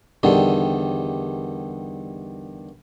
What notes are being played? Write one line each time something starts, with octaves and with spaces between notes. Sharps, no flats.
E2 D3 D#3 G3